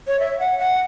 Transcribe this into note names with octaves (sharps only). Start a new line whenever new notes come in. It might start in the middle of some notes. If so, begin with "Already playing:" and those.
C#5
E5
F#5
F#5